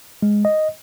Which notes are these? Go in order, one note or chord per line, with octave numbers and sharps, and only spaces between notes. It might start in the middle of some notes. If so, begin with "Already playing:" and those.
G#3
D#5